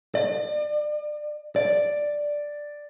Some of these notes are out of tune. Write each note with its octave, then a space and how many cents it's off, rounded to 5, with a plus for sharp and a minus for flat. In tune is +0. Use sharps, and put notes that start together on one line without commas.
D5 +40
D5 +5